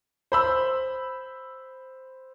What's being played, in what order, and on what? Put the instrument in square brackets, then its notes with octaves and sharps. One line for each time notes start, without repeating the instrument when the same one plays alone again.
[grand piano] C5 B5 E6